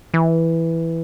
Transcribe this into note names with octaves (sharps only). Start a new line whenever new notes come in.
E3